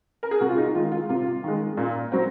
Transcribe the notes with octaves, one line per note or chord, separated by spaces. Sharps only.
A#4
G#4
C3 F#4
F4
D#4
D#3 G#3 F4
F4
C3 F4
D#3 G#3
A#2
F#3 C4